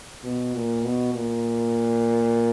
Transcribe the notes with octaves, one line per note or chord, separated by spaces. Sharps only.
B2
A#2
B2
A#2